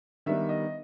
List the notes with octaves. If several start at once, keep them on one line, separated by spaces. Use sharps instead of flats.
D#3 G3 B3 D4 E5
D#5